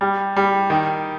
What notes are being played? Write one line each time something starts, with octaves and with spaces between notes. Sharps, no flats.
G3
G3
D#3